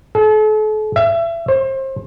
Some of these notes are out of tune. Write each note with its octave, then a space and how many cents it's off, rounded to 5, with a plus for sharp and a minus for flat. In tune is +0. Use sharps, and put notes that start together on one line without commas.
A4 -40
E5 +30
C5 +30